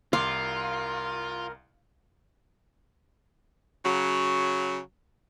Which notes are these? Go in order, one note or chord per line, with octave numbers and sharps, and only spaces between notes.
C2 F4 A#4 F5 C6 D6
C#3 F#3